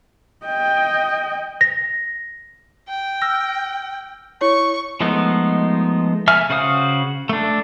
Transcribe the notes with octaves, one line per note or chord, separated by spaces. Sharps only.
D#5 G5
A#6
G5
E6 F6 A#6
E4 C#5 C#6
F3 G#3 A3 B3 D#4
E5 G#5 F6
C#3 F#4 C5 F5 D#6
A3 D4